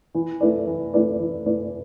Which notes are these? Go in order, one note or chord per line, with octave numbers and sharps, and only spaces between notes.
E3
A3 E4 B4 D5
E3
A3 E4 B4 D5
E3
A3 E4 B4 D5